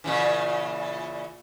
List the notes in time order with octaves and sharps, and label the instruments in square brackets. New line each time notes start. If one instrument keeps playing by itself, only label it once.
[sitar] A#2 C#3 E3